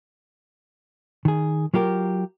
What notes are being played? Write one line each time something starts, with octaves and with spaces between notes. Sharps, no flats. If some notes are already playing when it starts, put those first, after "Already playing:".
D#3 G#4
F#3 F4 G4 A#4